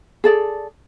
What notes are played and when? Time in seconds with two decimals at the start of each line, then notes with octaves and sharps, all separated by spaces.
0.24 G#4 A4 D5